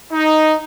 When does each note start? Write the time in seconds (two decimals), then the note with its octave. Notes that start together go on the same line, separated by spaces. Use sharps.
0.12 D#4